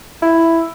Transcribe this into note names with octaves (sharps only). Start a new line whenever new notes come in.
E4